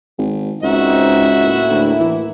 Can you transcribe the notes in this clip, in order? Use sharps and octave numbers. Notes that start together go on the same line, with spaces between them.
G#1
C#2 C4 D#4 F#4 E5
A2 A#3 E4
D2
E3